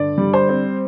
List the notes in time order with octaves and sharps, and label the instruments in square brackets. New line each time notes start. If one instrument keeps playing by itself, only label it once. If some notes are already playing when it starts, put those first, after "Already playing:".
Already playing: [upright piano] G2 D3 D5
G3
C5
C4